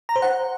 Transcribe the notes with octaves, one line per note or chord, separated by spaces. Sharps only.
A#5
C5
F#5